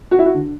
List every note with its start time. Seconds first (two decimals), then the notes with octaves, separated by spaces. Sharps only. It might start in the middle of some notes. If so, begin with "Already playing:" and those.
0.11 F#4
0.19 E4
0.26 F#4
0.34 D3